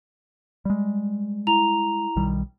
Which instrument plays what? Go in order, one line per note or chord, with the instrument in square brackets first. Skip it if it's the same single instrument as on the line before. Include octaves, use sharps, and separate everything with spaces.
[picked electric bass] G3 G#3
[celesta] E4 A#5 F7
[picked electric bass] B1 D#3 G3